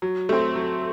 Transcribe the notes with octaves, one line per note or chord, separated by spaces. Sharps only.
F#3
A3 C4
F#3